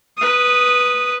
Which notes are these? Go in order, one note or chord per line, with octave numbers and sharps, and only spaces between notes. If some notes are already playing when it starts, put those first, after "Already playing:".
B4 D#6